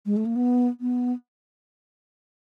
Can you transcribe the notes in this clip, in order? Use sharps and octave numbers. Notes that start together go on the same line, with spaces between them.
G#3
A3
A#3
B3
B3